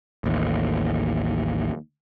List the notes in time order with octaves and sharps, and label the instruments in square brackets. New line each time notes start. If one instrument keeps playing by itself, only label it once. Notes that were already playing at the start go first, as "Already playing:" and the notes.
[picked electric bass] A1 D#2